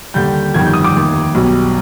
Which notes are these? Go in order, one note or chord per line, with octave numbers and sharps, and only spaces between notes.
D#2 D3 G3 G6
G1 F2 D#3 G3 G#6
G6
D#6
D6
F1 D#2 D#3
B1 B2 G3